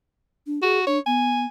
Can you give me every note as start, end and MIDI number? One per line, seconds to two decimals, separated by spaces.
0.47 0.62 62
0.63 0.84 66
0.63 0.79 68
0.87 0.99 62
0.87 0.99 73
1.06 1.45 59
1.06 1.47 80